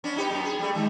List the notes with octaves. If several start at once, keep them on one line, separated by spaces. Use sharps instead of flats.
B3 C#4 D4
D#4 G4 B4
F#2 B3
G#4
G3 A3
D#3 G#3